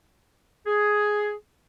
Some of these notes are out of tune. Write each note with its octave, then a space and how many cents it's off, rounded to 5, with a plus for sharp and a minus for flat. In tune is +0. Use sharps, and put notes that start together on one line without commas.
G#4 +5